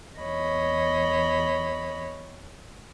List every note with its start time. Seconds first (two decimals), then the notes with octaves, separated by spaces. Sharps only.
0.22 E2 C#5 D#5 B5